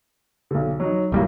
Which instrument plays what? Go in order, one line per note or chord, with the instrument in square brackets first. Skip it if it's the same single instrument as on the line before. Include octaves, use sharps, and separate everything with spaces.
[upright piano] B1 D3
F#3 D#4
[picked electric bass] D1 G3 A#3 [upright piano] G#1 E3 F#3